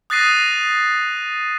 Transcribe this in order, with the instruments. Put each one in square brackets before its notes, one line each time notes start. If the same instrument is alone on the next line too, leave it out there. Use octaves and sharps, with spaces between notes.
[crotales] D#6 F#6 A6 A#6 C7 D#7